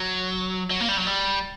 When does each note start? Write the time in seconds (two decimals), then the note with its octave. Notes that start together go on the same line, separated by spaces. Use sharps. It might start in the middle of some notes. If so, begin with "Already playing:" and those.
Already playing: F#3
0.71 F#3
0.80 A#3
0.89 G3
0.97 F#3
1.07 G3